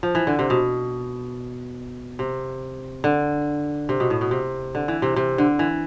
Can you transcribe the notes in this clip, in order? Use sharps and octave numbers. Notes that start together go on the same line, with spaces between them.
F3
E3
D3
C3
B2
C3
D3
C3
B2
A2
B2
C3
D3
E3
C3
C3
D3
E3